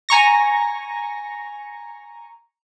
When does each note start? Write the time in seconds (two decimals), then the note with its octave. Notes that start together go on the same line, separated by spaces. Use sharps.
0.09 G#5 A#5 C#6 A#6